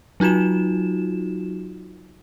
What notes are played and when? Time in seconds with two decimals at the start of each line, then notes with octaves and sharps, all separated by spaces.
0.20 F#3 D#4 F4 F#4 E7